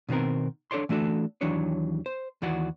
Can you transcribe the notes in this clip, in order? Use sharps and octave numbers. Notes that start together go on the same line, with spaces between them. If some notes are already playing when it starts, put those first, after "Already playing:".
B2 D#3 B3 C4 A#4
D4 A4 C#5 D5 C6
E3 A3 D4 F#4 A4
D#2 E3 F#3 D4 C#5
C5
D#2 E3 F#4 D5 F#5